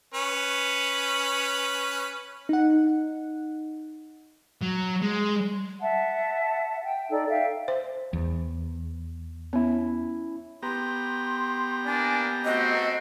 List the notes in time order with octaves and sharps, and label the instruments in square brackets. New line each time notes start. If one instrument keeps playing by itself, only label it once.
[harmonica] C#4 B4
[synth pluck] D#4 F#5
[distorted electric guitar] F#3
G#3
[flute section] E5 F#5 A5
G5
D#4 A4 D5
E5 F5 G5
[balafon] C5
[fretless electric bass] E2
[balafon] B3 [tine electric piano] C#4 E4
[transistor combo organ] B3 G4 A#5 [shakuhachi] C6
[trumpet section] A#3 D4 D5 [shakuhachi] G#5
[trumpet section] A3 C4 F#4 [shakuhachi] D#5